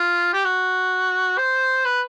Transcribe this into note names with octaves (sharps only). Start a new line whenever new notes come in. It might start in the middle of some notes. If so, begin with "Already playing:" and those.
Already playing: F4
G4
F#4
C5
B4